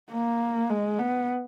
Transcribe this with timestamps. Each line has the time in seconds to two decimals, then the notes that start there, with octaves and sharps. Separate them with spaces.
0.12 A#3
0.70 G#3
0.99 B3